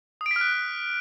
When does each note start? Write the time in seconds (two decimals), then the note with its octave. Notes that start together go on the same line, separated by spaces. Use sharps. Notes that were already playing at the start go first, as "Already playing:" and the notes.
0.21 D#6
0.26 D7
0.31 B6
0.36 F6
0.41 F#6